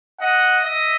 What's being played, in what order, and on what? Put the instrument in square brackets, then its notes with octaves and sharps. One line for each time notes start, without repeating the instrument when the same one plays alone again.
[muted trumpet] D#5 [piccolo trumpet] F#5
[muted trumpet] D#5 [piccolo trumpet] E5